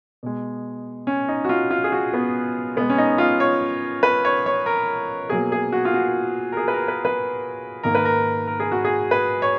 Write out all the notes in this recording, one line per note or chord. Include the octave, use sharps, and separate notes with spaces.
B2 G#3
C#4
D#4
F#4
F4
F4
G#4
F#4
B3
B2 G#3 B3
C#4
D#4
F4
C#5
B4
C#5
C#5
A#4
B2 F#3 A#3 G#4
G#4
F#4
F4
F#4
A#4
G#4
B4
A#4
B4
B4
G#2 D#3 A#3 A#4
B4
A#4
A#4
G#4
F#4
G#4
B4
C#5